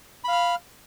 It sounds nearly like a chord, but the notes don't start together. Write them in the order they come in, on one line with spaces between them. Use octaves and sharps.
B5 F5 F6